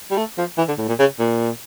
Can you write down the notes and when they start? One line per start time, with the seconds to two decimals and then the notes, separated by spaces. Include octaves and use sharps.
0.11 G3
0.18 A3
0.38 F3
0.58 E3
0.68 D3
0.78 A2
0.88 A#2
0.99 C#3
1.19 A#2